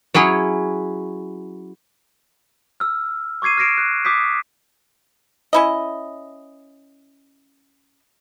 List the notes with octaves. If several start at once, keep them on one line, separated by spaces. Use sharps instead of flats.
F#3 C#4 E4 G#4
E6 F6
C#6 D6 G#6 C7 D#7
F6 G#6 A#6 C7 D7 E7
F#6
D6 D#6 G6 B6
C#4 E4 D#5